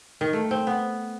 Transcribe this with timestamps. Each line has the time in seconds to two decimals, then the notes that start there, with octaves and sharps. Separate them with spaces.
0.21 D#3
0.33 A3
0.51 C4
0.67 B3